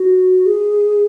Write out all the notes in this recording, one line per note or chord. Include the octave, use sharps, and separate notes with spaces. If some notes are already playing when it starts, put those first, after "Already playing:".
Already playing: F#4
G#4